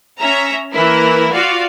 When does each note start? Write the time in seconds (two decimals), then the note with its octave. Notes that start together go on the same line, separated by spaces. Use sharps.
0.20 C#4 E5 A#5
0.72 E3 A#3 E4 A#4
1.33 F4 F#4 D5 F5